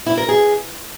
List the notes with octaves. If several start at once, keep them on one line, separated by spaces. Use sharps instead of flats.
E4
A#4
G#4